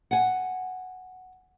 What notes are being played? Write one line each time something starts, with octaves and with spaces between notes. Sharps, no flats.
F#5 G#5